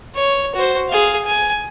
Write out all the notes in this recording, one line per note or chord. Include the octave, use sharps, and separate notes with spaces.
C#5
F#4 C5
G#4 F5
G#5